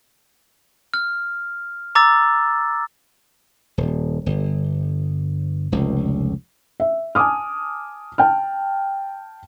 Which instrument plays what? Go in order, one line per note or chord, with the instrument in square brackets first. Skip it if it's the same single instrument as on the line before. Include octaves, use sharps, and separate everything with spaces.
[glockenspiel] F6
A#5 D6 E6 A6
[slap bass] D#1
G1
F1 C#2
[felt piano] E5
G#5 A5 D6 D#6 F6
G5 A5 F6